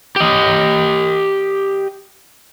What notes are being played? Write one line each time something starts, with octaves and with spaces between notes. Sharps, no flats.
G4 D#5